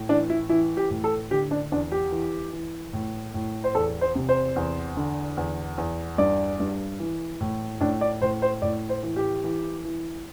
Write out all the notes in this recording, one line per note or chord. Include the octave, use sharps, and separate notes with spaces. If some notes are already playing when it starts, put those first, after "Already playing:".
Already playing: A2
E3 D4
E4
E3 E4
G4
A2
A4
D3 G4
D4
E2 D4
G4
E3
E3
A2
A2
C5
E2 A4
C5
C3
C5
E2
D3
E2
E2
G2 D5
G2
E3
A2
A2 D4
D5
A2 C5
C5
A2 D5
C5
E3
G4
E3
E3